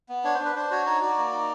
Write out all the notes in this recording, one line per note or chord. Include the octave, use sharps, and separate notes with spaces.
B3
D4 C#5
C5
D4
B4
D4 C5
F#4 C#5
D#4 C#5
F#4 D5
A#3
D#4